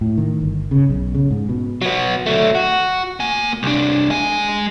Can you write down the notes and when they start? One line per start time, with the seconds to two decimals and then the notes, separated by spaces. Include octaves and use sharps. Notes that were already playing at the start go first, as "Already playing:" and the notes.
0.01 A2
0.17 D#3
0.41 G1
0.71 C#3
0.89 B1
1.15 C#3
1.31 G#2
1.49 B2
1.82 F#3 B3
2.26 F#3 A3
2.55 F#4
3.20 A#3 G#5
3.63 C2 D4
4.10 G#3 G#5